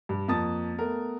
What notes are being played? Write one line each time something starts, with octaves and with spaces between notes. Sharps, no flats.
G2
F2 A#3 A5 D#6 A6
A3 B3 A#4